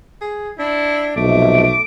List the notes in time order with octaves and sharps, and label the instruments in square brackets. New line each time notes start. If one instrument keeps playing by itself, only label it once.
[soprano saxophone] G#4
[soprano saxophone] D4 [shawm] E4
[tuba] B1 [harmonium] C3 F3 G#3 [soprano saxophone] A3 [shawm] D6